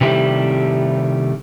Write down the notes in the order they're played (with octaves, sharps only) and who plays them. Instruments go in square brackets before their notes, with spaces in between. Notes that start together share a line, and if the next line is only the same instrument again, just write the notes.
[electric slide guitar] C3 D#3 G3 A3 E4 G4